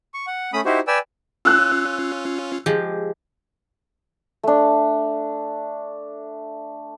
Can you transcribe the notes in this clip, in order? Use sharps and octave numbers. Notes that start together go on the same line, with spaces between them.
C#6
F#5
A3 C#4 B5 D#6
D#4 E4 F#4 G4 C5
B4 D5 G5 G#5 E6
C#4 F4 E6 F#6
F3 G#3 G4
A3 D4